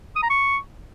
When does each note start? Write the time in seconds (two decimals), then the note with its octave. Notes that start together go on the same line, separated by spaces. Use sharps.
0.16 D#6
0.23 A#5
0.30 C#6